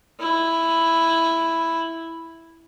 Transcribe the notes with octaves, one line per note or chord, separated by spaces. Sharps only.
E4